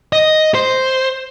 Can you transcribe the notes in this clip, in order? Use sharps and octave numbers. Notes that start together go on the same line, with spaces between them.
D#5
C5